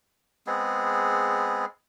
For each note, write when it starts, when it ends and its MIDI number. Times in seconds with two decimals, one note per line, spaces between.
0.47 1.65 56
0.47 1.65 59
0.47 1.65 60
0.47 1.65 68